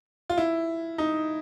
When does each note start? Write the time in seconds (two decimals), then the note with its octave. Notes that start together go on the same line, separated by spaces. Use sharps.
0.30 F4
0.38 E4
0.98 D#4